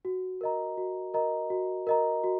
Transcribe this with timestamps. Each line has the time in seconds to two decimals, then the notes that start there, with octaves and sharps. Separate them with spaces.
0.05 F#4
0.41 A#4 D#5 A#5
0.77 F#4
1.14 A#4 D#5 A#5
1.50 F#4
1.87 A#4 D#5 A#5
2.24 F#4